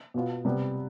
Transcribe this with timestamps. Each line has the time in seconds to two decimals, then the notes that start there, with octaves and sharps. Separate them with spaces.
0.14 B2 B3 F4
0.45 C3 G3 B3